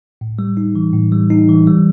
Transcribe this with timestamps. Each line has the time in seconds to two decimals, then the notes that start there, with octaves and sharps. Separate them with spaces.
0.21 A2
0.39 G3
0.57 D#4
0.75 E3
0.93 A2
1.12 G3
1.30 D#4
1.49 E3
1.67 G3